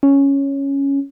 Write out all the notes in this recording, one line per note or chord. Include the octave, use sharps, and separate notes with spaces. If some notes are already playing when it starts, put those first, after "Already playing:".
C#4